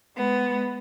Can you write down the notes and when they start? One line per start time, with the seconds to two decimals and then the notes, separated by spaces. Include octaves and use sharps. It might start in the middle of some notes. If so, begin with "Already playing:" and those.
0.16 G#3 B3